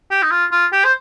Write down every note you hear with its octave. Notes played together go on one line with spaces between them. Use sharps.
G4
D#4
F4
F4
G4
C5